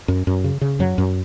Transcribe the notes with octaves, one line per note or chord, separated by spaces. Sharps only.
F#2
F#2
C#3
C#3
F#2 F#3
F#2